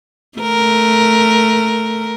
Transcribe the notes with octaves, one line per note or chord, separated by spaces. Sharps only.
A3 A#4